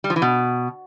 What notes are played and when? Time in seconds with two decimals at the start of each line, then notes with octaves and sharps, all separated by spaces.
0.04 G3
0.10 F3
0.16 E3
0.22 B2